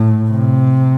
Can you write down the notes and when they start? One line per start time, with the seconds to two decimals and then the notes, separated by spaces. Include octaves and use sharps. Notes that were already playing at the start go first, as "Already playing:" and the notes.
Already playing: A2
0.30 C3